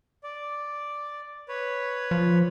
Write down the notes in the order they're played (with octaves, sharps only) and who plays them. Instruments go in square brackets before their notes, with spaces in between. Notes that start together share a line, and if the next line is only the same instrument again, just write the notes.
[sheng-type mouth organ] D5
B4 C#5
[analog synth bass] F3